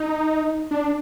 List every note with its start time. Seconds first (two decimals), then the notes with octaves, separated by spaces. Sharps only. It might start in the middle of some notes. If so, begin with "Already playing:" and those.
Already playing: D#4
0.71 D4